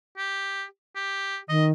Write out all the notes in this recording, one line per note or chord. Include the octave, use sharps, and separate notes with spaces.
G4
G4
D#3 D#5